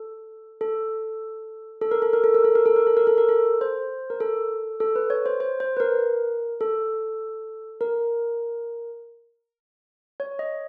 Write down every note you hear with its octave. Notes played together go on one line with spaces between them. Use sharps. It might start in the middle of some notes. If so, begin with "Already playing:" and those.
Already playing: A4
A4
A4
A#4
A4
A#4
A4
A#4
A4
A#4
A4
A#4
A4
A#4
A4
A#4
A4
C5
A#4
A4
A4
B4
C#5
C5
C5
C5
B4
A#4
A4
A#4
C#5
D#5